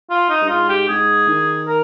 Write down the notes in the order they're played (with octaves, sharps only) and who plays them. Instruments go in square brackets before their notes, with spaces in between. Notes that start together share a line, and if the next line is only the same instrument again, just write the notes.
[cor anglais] F4
D#4
[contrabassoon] G2
[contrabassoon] G#2 [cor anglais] F4
[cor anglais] G4
[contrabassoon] G#2 [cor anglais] G#4
[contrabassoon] D#3
[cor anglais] A#4